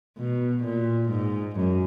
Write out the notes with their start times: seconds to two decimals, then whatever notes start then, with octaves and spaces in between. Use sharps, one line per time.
0.18 B2
0.64 A#2
1.10 G#2
1.56 F#2